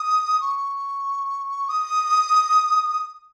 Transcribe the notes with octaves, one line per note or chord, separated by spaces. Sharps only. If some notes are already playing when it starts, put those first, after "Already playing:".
Already playing: D#6
C#6
D#6